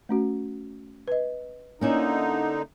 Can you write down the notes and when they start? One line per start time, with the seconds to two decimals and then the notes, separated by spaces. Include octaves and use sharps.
0.09 A3 C#4 F#4
1.08 B4 D#5
1.81 D3 A#3 C#4 D#4 E4